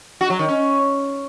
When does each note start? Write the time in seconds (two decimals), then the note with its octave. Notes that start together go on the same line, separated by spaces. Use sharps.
0.21 F#4
0.30 F#3
0.39 D#3
0.48 C#4